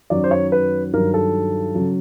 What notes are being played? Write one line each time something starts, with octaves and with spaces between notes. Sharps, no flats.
F#2 D#3 F#3 D5
C5
C#5
B4
G2 D#3 F#3 A#4
A4
C#3 F#3